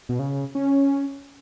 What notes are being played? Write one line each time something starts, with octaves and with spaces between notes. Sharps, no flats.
B2
C#3
C#4